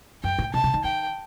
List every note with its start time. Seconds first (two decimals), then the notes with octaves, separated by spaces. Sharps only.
0.23 F#2 G5
0.39 A2
0.54 B2 A5
0.64 C3
0.74 D#3
0.84 D#3 G5